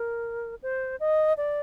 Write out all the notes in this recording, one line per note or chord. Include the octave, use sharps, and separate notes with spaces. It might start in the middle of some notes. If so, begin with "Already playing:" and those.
Already playing: A#4
C5
D#5
D5